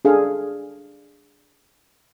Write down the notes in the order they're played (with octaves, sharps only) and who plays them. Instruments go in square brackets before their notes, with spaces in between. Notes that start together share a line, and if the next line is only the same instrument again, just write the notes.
[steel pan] D4 G#4 A4 F5